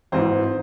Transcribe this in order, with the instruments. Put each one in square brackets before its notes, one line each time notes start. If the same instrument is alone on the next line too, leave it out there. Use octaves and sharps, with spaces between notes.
[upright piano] G#1 G#2 E3 C5